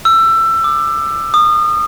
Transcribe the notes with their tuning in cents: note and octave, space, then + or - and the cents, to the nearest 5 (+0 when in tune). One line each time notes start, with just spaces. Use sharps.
E6 +20
D6 +25
D#6 -30